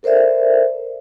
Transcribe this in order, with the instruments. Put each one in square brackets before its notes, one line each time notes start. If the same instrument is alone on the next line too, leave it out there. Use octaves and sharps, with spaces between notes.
[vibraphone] A4 A#4 C5 D5 E5